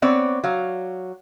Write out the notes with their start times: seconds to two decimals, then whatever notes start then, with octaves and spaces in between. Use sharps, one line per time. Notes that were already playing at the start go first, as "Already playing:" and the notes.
0.02 B3 C4 C#5 D5
0.44 F#3 F5